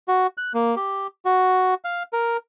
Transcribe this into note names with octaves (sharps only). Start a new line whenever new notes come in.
F#4
F#6
A#3
G4
F#4
F5
A#4